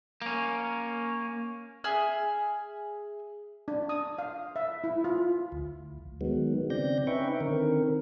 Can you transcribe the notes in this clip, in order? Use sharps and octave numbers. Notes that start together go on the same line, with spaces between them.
A#3 C#4
G#4 E5 F6
D4
D#6
F5
E5
E4
F4
D2
D#3 F#3 G#3 B3
C#3 C4 D5 G6 A#6
C#4 D#4 B4 E5 G5 C#6
D3 D#3 C4 A#4